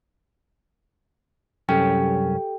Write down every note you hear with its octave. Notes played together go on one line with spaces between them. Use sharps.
C2 F#2 C#4 G4 A4 G5